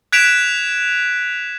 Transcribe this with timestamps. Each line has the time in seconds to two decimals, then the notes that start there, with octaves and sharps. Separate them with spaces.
0.12 F#6 G#6 B6 D7 E7 F7